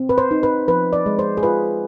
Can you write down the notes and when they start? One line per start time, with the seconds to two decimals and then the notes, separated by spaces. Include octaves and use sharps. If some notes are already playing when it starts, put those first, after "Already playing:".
Already playing: C4
0.09 B4
0.18 C5
0.31 D#4
0.43 B4
0.68 F3 B4
0.93 D5
1.06 G#3
1.19 C5
1.37 G#4
1.43 F4 B4